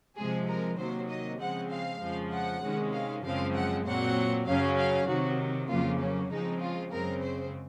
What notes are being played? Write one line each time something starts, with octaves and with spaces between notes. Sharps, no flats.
C3 F3 G#3 G#4
A#4
C3 D#3 F#3 A#3 C5
D#5
C#3 F3 G#3 C4 F#5
F5
F2 C#3 F3 G#3
F#5
C3 D#3 G#3 C#4
F5
F#2 C#3 F3 G#3 C4 F5
F#5
A#2 F#3 C4 F#5
F#2 C#3 F#3 C#4 F5
F5
C3 D#3 F#3 F#4
F2 C#3 F#3 A#3 F4
C#4
C#3 F3 G#3 C4 D#4
F4
F#2 C#3 G#3 C4 A#4
C5